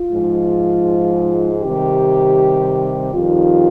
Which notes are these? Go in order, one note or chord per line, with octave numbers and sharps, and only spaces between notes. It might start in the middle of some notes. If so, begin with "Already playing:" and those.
Already playing: F4
G#2 F3 G#3
C3 D#3 G3 G4
F2 D#3 G3 F4